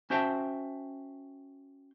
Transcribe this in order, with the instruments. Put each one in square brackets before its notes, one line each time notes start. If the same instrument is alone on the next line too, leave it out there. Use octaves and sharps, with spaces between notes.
[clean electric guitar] C#4 F#4 C5 E5 G5 A5